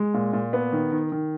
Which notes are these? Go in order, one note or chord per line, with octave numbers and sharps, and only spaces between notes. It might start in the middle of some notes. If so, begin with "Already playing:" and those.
Already playing: G#3
A#2
A#2
B3
D#3
D#3
D#3